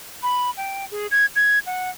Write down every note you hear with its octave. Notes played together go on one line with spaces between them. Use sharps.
B5
G5
G#4
G#6
G#6
F#5